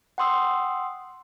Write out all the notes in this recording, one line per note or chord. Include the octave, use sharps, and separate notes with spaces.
F#5 G5 C6 D#6 E6